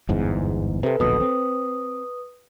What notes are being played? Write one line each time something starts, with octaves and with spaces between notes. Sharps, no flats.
G1 E2 G#2
C3 A4 B4
D1 A#1 B2 B4 D#6
C4